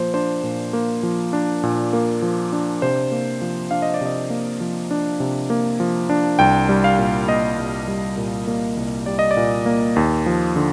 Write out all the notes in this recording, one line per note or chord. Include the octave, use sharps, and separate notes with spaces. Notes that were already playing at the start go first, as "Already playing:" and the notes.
Already playing: A#2 F3 A#3 C5
D4 C5
A#2
A#3
F3
D4
A#2
A#3
F3
D4
C3 C5
A#3
F3
D4 F5
D#5
D5
C3 D#5
A#3
F3
D4
C3
A#3
F3
D4
C2 G5
G3
F5
A#2
A#3 D#5
C2
G3
A#2
A#3
C2
G3 D5
D#5
D5
A#2
A#3
D#2
F3
D3